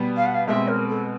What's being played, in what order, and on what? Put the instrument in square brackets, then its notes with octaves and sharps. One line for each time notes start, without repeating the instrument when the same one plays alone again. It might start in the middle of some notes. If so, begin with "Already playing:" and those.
Already playing: [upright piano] B2 G3 B3
[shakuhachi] F5
F#5
F5
[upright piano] B2 G#3 C4 [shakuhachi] E5
[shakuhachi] A#4
A4